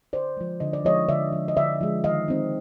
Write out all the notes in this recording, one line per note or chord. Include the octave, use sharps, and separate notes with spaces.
D3 C5 D5
F3 G#3
D3 D#5
D5
F3 G#3 C#5 D#5
D3 D5 E5
F3 G#3
D#5
D3 D5 E5
F3 G#3
D#3 D#5 F5
G#3 C4 D#4